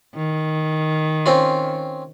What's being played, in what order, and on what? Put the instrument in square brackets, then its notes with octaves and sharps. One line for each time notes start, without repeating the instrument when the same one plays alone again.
[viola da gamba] D#3
[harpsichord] C4 C#4 F4